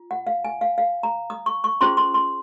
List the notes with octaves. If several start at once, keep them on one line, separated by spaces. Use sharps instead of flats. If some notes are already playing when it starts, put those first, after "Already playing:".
Already playing: F4
F#5
F5
G#5
F5
F5
A#5
D#6
C#6
C#6
C#4 F4 G#4 C5 C6
C6
C6